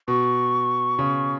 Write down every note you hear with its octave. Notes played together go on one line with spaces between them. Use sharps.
B2 C#6
C#3